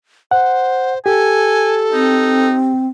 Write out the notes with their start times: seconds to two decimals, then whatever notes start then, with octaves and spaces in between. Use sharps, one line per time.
0.31 C5 F#5
1.06 G4 A4 G#5
1.93 C4 D#4